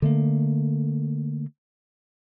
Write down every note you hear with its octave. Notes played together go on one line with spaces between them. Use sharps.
D3 A3 A#3